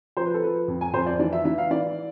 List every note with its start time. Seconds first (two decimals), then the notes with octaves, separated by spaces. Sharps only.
0.17 F3 C5
0.26 B4
0.34 A4
0.43 F3 B4
0.68 F2
0.81 G#5
0.94 F2 C5
1.06 D5
1.19 E3 D5
1.33 E5
1.45 E3 E5
1.58 F5
1.71 E3 D5